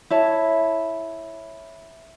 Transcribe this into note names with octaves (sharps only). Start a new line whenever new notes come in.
E4 C#5 A5